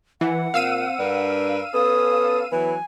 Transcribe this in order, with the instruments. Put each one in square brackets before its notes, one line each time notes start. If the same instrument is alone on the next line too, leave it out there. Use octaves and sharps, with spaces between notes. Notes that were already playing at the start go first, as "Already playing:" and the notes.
[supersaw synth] E3 [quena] F#5
[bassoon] A#2 [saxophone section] C4 [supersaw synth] F5 E6 D#7
[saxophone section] G2 A#4 B4 [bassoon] D4
[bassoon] B3 [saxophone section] C#4 A4 [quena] D#6
[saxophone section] E3 F#3 E4 [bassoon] B3 [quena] G#5